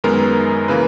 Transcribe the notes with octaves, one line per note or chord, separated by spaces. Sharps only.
F#2 D#3 G#3 B3 A#4
C#3 E3 A#3 B4